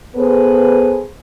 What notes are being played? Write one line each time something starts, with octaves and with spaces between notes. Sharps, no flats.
B3 G#4 A4 B4 C5